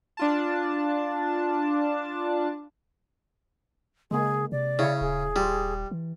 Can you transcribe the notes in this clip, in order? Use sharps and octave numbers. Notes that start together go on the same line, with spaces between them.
D4 F4 A5
C#3 G#3 A#3 G#4
C3 D5
C#3 E4 C#5
D#1 G#4
G3 F4
E3